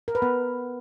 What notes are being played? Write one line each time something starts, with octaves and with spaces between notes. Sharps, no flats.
A#4
B4
B3